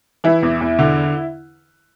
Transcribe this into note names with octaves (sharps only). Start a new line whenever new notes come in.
E3 E4
E2
E2
D3